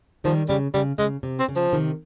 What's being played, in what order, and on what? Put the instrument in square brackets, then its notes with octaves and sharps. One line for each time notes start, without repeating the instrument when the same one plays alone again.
[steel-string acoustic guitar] D#3 G3 [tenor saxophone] F3
[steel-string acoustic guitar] C#3 [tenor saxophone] G3
[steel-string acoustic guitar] C#3 [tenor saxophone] G3
[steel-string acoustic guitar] C#3 [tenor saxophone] G#3
[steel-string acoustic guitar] C3
[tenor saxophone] C4
[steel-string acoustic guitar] C#3
[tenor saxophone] F3
[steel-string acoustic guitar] C3 D#3